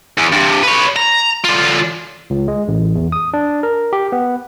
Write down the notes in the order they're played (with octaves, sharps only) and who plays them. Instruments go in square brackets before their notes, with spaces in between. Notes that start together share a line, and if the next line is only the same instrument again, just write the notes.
[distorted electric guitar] E2
G2 C3
B4 C#5
A#5
D3 F4
[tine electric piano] C#2
G#3
A1
E2
D#6
D4
A#4
G4
B3